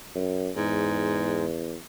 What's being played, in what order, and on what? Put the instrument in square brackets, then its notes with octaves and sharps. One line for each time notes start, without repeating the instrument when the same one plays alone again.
[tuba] F#2
[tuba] E2 [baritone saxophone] G#2